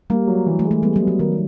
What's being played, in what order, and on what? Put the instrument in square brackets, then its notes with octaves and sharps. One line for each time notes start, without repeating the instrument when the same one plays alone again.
[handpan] G3 [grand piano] A#3
[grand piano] F#3
E3
[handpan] A3
[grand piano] G#3
[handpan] A3
[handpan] G3 [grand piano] B3
[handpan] F#3
[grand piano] B3
[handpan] F3
[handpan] D#3 [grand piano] A#4